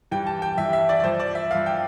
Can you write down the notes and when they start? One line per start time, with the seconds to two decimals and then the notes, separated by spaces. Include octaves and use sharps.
0.11 G2 E3 G3 G5
0.27 A5
0.42 G5
0.58 G2 E3 G3 E5
0.73 E5
0.89 D5
1.00 D5
1.04 G2 F3 C5
1.20 D5
1.35 E5
1.51 G2 F3 F5
1.66 G5